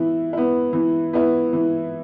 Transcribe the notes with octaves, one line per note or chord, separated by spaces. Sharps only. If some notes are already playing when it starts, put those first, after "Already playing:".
Already playing: E3 B3 E4
B3 E4
E3
B3 E4
E3